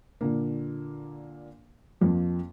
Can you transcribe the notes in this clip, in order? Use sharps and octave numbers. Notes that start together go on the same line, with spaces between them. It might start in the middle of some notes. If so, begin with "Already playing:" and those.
A#2 D3 A#3
F2 F3 A#3